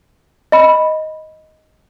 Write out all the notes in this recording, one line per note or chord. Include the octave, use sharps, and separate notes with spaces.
D#5 B5